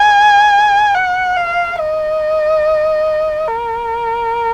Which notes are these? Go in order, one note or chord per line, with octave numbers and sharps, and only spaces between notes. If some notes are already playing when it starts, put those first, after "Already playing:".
Already playing: G#5
F#5
F5
D#5
A#4